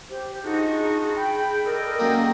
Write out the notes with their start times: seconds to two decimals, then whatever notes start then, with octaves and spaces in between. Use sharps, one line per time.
0.09 G4 C5
0.44 D4 D#4 F4 F#4 G#4
1.17 G5 B5
1.66 A4 A#4 D5 D#5
1.99 C#3 F#3 A#3 A#4 G5